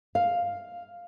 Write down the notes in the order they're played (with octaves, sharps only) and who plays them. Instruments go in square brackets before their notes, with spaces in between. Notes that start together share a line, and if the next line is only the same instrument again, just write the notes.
[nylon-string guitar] F5